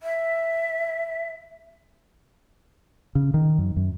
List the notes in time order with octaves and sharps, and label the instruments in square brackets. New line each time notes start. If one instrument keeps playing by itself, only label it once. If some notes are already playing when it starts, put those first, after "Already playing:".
[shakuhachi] E5
[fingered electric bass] C#3
D#3
F#2
F#2